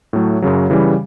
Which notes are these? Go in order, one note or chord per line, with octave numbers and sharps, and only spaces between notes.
A2 F#3 A3
F#2 C#3 F#3
C#3 E3 G3